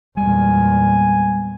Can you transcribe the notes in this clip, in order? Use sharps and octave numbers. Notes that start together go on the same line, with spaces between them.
E2 A#2 G3 G#3 G#5